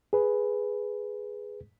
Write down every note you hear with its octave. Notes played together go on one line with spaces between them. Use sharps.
G#4 B4